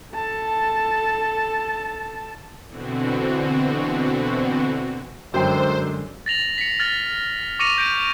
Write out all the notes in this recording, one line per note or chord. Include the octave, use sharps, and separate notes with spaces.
A4 A5
B2 D3 E3 C4 F#4
F#2 D3 G#3 C5 G5
A6 A#6 F7 F#7
B6 C#7
F6 A6 F#7
C#6 D6 A#6 C#7 D#7 F7
G6 A#6 D7